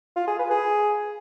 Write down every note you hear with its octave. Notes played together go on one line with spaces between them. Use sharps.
F4
G#4
B4
G#4